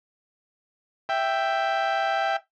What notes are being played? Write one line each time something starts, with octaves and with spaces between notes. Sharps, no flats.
E5 G5